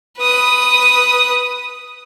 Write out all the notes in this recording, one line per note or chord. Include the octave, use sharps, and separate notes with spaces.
B4 D#6